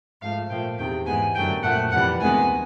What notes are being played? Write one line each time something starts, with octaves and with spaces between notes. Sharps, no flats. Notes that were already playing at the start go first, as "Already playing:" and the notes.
G#2 F3 A3 F5
A#2 F3 A3 G5
E2 C3 D#3 G5
G#2 E3 G#3 B3 G#5
F#2 D3 F#3 A3 G5
A#2 F3 A3 F#5
F2 C3 E3 G3 F#5
D2 C3 D#3 G#3 B3 G#5